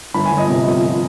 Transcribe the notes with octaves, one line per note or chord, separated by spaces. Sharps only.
G1 B5
G#5
G1
D#5
C3
F3